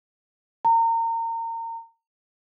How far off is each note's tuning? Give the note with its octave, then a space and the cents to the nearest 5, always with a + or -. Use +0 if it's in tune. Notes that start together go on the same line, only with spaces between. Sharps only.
A#5 -30